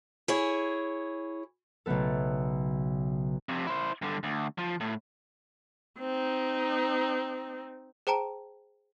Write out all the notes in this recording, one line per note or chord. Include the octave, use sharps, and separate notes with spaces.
E4 G#4 C#5
B1 C#3 A3 B3 A4
F2 C3
E4 C5
G2 D3
D2
F3
A2
C4 D#4
G#4 C5 G5 A5 A#5 D7